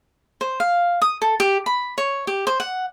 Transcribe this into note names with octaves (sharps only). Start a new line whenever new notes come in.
C5
F5
D#6
A4
G4
B5
C#5
G4
C5
F#5